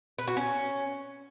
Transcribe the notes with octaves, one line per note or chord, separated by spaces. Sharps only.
B4
F#4
C#4